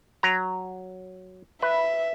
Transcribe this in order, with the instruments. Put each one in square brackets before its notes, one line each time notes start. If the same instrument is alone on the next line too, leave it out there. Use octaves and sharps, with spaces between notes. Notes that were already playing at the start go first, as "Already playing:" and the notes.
[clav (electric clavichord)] F#3 A#5
[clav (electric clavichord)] B4 [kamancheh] E5